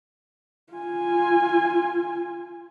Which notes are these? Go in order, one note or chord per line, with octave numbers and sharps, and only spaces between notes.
F4 G#5